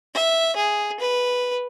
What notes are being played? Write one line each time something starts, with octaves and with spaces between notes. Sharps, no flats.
E5
G#4
B4